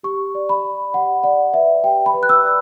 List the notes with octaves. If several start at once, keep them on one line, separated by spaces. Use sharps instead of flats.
G4 C#6
D5
B5
D5
G4 F#5
D5 F#5
B4 E5
G4 G5
B5
B4
F#6
E6
D5